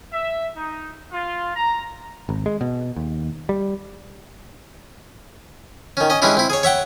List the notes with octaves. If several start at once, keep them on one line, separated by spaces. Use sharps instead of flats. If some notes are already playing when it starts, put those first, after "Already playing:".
E5
D#4
F4
A#5
G#1
G#3
B2
D#2
G3
D#3 C#4
C#4 D#5
E3 G3 G#3 C#4 D4 E4
C4 E4
G#4 C#5
C#5 E5 F#5 G5